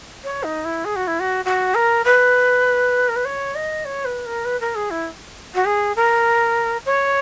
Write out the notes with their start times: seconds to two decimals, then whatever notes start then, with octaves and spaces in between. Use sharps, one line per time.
0.24 C#5
0.43 D#4
0.65 E4
0.85 G#4
0.96 F#4
1.07 E4
1.19 F#4
1.45 F#4
1.74 A#4
2.05 B4
3.08 A#4
3.16 B4
3.25 C#5
3.55 D#5
3.85 C#5
4.05 B4
4.26 A#4
4.45 B4
4.60 A#4
4.75 G#4
4.90 E4
5.54 F#4
5.65 G#4
5.96 A#4
6.85 C#5